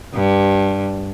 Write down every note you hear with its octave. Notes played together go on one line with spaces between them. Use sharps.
G2